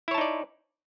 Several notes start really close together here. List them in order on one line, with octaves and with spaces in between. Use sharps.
E4 C#5 A5 D#4 D5